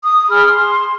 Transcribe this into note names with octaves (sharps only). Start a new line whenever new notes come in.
D#6
G#4 B5 F6
C6